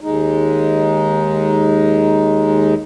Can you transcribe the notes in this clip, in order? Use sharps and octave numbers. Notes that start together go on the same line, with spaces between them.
D#2 G#3 D#4